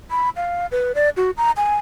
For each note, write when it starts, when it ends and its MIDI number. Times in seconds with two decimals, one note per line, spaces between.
0.11 0.29 83
0.36 0.66 77
0.72 0.92 71
0.95 1.10 74
1.17 1.31 66
1.37 1.51 82
1.57 1.77 80